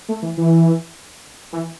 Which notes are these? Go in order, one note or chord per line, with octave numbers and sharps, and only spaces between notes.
A3
E3
E3
E3